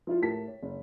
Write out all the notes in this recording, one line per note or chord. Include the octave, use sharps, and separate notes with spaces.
F3 E4 F4
A2 G4 A#4 A5 B6
C#5
F#1